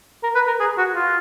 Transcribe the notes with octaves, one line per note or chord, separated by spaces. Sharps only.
A#4
B4
A#4
G#4
F#4
F4